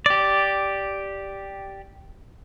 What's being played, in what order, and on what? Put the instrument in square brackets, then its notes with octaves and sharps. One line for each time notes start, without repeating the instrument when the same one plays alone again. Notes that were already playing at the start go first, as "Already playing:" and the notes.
[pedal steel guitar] G4 D5